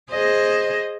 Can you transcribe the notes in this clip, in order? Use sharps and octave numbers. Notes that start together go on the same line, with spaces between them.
G#4 C5 D#5